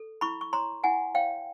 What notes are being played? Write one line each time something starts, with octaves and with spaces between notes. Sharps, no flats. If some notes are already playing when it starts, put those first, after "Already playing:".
Already playing: A4
E4 B5 C#6
C#6
C#5 A#5 C6
E4 F#5 G#5
C#5 F5 G5